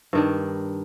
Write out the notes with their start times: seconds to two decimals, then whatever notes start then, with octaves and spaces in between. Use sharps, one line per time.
0.13 G2 D#3 D4